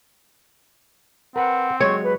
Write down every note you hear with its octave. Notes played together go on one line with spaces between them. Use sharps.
C4 A#4 B4 F#5
F#3 G#3 C#5 C#6
B4